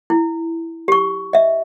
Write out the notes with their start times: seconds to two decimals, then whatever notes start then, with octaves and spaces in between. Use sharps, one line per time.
0.10 E4
0.88 G4 C#6
1.33 D#5 E5